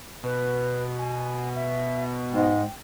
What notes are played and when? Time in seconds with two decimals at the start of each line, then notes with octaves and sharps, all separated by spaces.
0.24 B2 B4
0.98 G#5
1.55 E5
2.32 G#2 G#3 G5